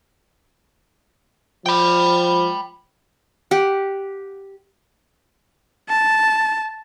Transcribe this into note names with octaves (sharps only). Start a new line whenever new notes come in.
F3 G5 B5
G4 F#5
A5